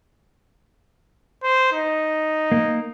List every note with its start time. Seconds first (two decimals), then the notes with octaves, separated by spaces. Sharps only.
1.43 C5
1.73 D#4
2.52 A#3